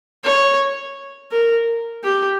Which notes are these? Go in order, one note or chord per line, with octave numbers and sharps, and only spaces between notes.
C#5
A#4
G4